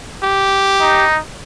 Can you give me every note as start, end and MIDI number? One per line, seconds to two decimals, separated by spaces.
0.23 1.05 67
0.81 1.19 63